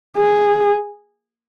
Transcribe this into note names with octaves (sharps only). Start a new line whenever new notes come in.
G#4